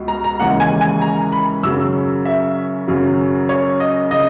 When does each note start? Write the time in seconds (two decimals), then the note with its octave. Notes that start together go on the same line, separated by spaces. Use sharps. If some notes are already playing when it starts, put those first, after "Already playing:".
Already playing: C#2 B2 G#3
0.08 A#5
0.24 A#5
0.40 D#2 C#3 E3 G#3 F#5
0.60 G#5
0.81 G#5
1.02 A#5
1.32 B5
1.63 F#2 C#3 F#3 E6
2.25 E5
2.88 F#2 C#3 F#3
3.49 C#5
3.80 D#5
4.11 C#3 D#5